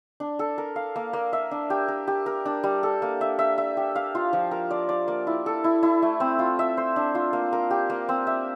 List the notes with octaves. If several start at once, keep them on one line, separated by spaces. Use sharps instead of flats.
D4
A4
A#4
F5
A#3
A#3
E5
D4
G4
A#4
G4
A#4
D4
G3
A4
A#3
E5
E5
E5
G4
F5
F4
F3
A#4
D5
D5
A#3
E4
A4
E4
E4
A3
C4
F4
E5
C5
D4
F4
A#3
A#4
G4
A#3
C4
E5